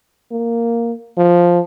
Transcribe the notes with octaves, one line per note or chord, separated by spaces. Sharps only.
A#3
F3